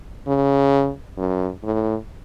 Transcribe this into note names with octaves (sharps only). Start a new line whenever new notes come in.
C#3
F#2
A2